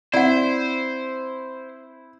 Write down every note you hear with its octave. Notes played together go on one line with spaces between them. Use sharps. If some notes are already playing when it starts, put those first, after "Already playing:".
C4 E4 C5 D5 F#5